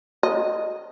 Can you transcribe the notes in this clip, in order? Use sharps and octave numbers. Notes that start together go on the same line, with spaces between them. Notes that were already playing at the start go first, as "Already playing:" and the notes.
D#5